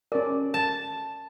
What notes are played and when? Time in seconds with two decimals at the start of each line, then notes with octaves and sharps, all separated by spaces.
0.12 C#4 A#4 D5
0.54 A5